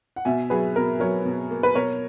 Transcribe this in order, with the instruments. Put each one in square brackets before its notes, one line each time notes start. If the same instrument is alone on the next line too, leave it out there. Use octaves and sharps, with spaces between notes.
[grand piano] F#5
[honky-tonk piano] B2 [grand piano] E5 G#5
[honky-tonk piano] F#3 [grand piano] G#4 B4
[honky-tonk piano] B2 [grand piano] A#4
[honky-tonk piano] F#3 [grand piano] A#4 C#5
[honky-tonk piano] B2
A#3
[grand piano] B4
[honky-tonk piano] B2 [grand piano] A#4 C#5